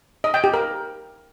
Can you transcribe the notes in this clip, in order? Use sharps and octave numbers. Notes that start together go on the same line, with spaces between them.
D#5
G5
G4
A#4